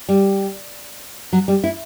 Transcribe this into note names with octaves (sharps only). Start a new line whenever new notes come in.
G3
F#3
G3
E4